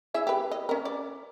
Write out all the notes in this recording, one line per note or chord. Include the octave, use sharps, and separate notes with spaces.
E4 G#4 E5
G4 B4
D#5
C#4 A#4
D5